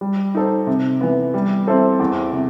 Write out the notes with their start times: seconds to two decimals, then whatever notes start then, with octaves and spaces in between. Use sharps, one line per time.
0.01 G3
0.35 D#4 A4 C5
0.67 C3
1.01 E3 B3
1.34 G3
1.67 C4 E4 A4 C5
1.99 E2
2.33 C3